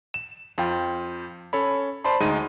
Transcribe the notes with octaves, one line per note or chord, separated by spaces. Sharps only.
E7
F2 F4 G5
C#4 A4 C#5 B5
C5 D5 A5 B5 C6
D2 G#3 D#4 G#4 D#7